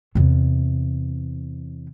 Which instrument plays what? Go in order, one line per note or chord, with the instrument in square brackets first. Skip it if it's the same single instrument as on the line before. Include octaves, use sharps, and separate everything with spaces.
[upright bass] E2 C3